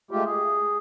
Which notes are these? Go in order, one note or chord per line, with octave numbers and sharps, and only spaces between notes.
G#3 A3 F4 G4
G#4